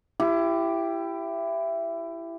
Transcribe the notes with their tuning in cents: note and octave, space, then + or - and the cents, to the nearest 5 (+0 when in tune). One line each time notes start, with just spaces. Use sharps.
E4 +20 G4 +0